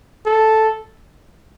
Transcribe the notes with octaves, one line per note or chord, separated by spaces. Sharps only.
A4